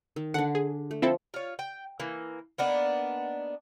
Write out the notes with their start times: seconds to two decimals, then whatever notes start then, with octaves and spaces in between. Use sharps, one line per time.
0.16 D#3
0.34 D3 D4 F#5
0.55 G#4
0.91 A3
1.02 F3 C4 E4 A4
1.34 F4 C#5
1.59 G5
2.00 E3 A#3
2.58 A#3 B3 D4 D#4